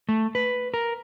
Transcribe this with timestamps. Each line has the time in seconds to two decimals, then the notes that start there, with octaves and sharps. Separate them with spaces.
0.09 A3
0.35 B4
0.74 A#4